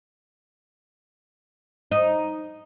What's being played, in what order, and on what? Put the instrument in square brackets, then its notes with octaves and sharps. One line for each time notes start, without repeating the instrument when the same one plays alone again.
[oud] D#4